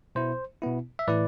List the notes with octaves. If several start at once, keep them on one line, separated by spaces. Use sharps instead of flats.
B2 B3 E4 C5
B2 B3 E4
E5
A2 E3 A3 E4 B4 D5